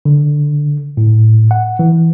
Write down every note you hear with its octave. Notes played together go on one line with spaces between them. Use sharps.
D3
A2
F#5
E3